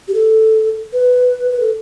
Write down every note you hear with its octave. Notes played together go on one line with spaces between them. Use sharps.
G4
A4
B4
B4
A4